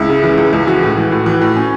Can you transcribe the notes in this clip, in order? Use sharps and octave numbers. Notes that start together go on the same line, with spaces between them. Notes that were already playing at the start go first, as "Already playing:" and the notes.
Already playing: C#2 E4
C#3
E3
C#2
C#2
E3 F#4
A2
E3
A2
E3
A2
C#4